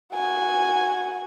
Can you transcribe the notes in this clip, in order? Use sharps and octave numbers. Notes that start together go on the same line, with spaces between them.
F#4 G#5